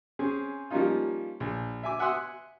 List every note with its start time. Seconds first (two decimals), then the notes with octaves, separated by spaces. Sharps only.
0.19 C4 C#4 G#4
0.70 F3 G3 A#3 C#4 D#4 F4
1.40 A#1
1.83 E5 G#5 D6
1.99 E5 F#5 G#5 C6 D#6 F#6